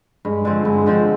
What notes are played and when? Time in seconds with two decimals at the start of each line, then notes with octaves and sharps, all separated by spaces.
0.25 G2 G#3
0.45 D3 F3 C4
0.65 G2 G#3
0.86 D3 F3 C4